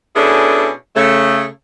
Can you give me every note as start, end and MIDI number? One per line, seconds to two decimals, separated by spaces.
0.16 0.71 47
0.16 0.71 61
0.16 0.71 62
0.16 0.71 64
0.16 0.71 68
0.16 0.71 69
0.96 1.45 49
0.96 1.45 57